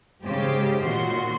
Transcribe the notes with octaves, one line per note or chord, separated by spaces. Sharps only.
G#2 C#3 G4 C5
A#2 D#3 F#4 C6